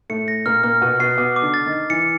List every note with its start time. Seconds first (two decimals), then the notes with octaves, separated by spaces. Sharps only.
0.10 A2 A3 C#7
0.28 A#6
0.46 A#2 A#3 F6
0.64 A#2 A#3 F6
0.82 B2 B3 F6
1.00 B2 B3 C7
1.18 B2 B3 D6
1.36 D6
1.42 D3 D4
1.54 A6
1.66 D#3 D#4
1.73 A6
1.90 E3 E4 C#7